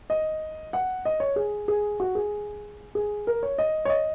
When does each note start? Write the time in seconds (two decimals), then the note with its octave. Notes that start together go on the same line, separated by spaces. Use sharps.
0.10 D#5
0.73 F#5
1.05 D#5
1.20 C#5
1.36 G#4
1.68 G#4
2.00 F#4
2.15 G#4
2.95 G#4
3.27 A#4
3.43 C#5
3.58 D#5
3.85 C#5
3.89 D#5